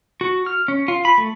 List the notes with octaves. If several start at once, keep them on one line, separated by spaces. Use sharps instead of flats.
F#4
F6
C#4
F4
B5
A3